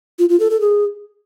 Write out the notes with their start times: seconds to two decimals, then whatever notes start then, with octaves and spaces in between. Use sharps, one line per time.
0.19 F4
0.29 F4
0.40 A4
0.50 A4
0.61 G#4